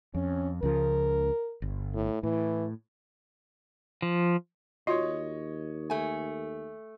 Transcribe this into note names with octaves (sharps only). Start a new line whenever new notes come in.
F2 C#4
C#2 C#3 F3 A#4
G1
A2
A2 E3
F3
D#2 F4 F#4 C#5 D#5 C6
A3 G#5